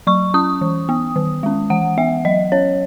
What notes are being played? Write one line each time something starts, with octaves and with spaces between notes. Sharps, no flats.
F#3 C#6
C#4 D#6
E3
B3
D#3
G#3 C#4
E3 F#5
B3 E5
F#3 D#5
C#4 C#5